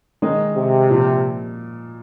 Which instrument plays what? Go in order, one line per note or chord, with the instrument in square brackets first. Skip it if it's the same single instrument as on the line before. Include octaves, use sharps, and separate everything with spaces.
[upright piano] D#3 G#3 D#4 A#4 D#5
[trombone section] C3
[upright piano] A#2 F3